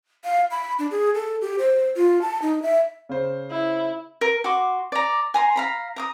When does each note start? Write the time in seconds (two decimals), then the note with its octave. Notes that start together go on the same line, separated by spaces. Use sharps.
0.24 F5
0.51 B5
0.79 D4
0.91 G#4
1.15 A4
1.41 G4
1.58 C5
1.96 F4
2.21 A5
2.42 D#4
2.62 E5
3.09 C#3 C5
3.51 E4
4.21 A#4
4.44 F#4 C6 D6
4.92 D5 A#5
5.34 G#5 A#5 C6
5.56 F5 A#5 B5
5.96 A#5 D6 D#6